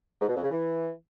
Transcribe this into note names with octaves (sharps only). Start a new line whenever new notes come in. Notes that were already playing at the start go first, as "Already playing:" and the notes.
G#2
B2
F2
C#3
E3